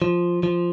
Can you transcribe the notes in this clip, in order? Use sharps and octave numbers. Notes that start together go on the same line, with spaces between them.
F3
F3